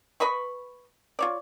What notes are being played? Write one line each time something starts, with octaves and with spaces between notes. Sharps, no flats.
B4 D#5 B5 C#6
F4 C#5 D5